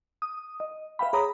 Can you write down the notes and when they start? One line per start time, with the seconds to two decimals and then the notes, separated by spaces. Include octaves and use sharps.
0.22 D#6
0.60 D#5
0.99 B4 E5 F5 G5 B5
1.13 G#4 C#5 A#5 B5 D#6